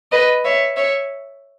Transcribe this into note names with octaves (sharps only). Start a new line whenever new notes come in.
B4 D#5
C#5 E5
C#5 E5